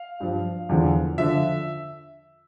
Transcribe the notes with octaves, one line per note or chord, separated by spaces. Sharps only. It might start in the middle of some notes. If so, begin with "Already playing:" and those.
Already playing: F5
G2 F3
E2 D3 F3
D3 F3 E5